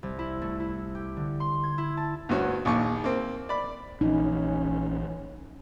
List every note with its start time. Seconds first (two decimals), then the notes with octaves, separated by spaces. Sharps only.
0.03 C2
0.19 E4
0.42 A3
0.60 E4
0.95 G4
1.17 D3
1.40 C6
1.64 G#6
1.78 E4
1.97 A5
2.29 D2 G2 F#4 C#5
2.65 A#1 D#2 C#6
3.04 A#3 C4
3.49 D5 B5
4.01 A#1 E3 C#4 D#4